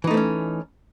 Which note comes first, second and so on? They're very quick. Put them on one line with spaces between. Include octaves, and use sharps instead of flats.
E3 D#4 A3 C4 C#4